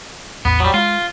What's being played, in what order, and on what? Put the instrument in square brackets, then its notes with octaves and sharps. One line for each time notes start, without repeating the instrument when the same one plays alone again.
[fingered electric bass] A1 E2 [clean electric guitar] B3
[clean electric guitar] F#3 G3
[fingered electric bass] G#3 [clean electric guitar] F4